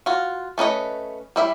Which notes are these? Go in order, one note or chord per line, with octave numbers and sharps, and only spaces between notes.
F4 F#4
A3 C#4 B4 D#5
G3 E4 E5